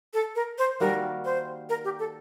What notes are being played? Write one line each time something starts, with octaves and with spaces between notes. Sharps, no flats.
A4
A#4
C5
D#3 G3 A#3 F#4 A#4
C5
A#4
G4
A4